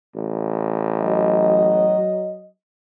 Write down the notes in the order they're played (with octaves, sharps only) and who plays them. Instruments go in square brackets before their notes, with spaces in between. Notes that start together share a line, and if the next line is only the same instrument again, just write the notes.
[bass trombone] A1
[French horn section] F#3 D#5